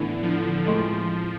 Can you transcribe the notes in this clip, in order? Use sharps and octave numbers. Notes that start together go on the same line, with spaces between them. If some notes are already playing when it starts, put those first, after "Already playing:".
Already playing: A2 D3 E3 B3 E4
F3
A2 F3 G#3 C4